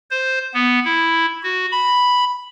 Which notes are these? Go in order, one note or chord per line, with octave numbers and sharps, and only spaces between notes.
C5
B3
E4
F#4
B5